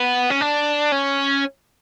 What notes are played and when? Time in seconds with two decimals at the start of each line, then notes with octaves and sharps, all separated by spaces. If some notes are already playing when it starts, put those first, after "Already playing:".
Already playing: B3
0.30 C#4
0.41 D4
0.92 C#4